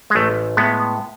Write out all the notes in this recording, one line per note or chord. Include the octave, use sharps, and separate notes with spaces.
G#3
A1 A3
A2 G#3 B3